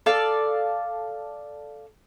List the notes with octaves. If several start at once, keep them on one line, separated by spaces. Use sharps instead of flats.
A4 D5 F5